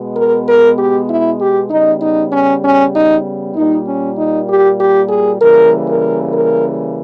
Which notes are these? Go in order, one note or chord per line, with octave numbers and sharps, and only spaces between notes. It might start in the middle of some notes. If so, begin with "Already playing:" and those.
Already playing: B2 G#3 B3
A#4
A#4
G4
E4
G4
C#3 G3 B3 D#4
D#4
C#4
C#4
D#4
A#2 G3 A#3 D#4
C#4
D#4
G4
G4
G#4
C#3 E3 G3 A#3 A#4
A#4
A#4